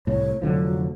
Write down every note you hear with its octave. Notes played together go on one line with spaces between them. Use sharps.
C2 A2 C#5
F1 D3 F3 F#3